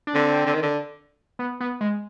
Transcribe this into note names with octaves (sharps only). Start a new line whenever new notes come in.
D4
D3 C4
D3
D#3
D3
B3
B3
G#3